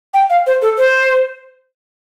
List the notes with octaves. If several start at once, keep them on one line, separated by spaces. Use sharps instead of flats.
G5
F5
C5
A4
C5